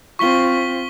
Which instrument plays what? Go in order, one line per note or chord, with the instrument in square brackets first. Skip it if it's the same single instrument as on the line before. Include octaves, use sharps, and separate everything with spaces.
[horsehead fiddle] C4 F4 [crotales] C#6 B6 G7